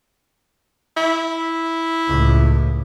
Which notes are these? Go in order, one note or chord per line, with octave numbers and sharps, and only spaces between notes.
E4
C#2 A2